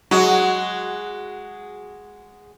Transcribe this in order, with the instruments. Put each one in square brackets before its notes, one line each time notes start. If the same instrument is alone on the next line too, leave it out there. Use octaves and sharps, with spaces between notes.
[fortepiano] F#3 [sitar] G#3 F#4